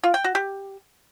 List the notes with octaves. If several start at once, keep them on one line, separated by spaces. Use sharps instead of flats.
F4
G5
F#4
G4